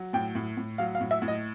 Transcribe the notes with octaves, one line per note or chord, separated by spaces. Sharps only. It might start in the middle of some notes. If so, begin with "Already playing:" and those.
Already playing: F#3
A2 G5
A2
A2
F#3 F5
F5
A2
E5
A2
D#5